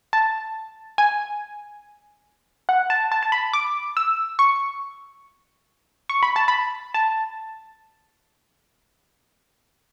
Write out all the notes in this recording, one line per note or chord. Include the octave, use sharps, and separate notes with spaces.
A5
G#5
F#5
A5
A5
A5
B5
D6
E6
C#6
C#6
B5
A5
B5
A5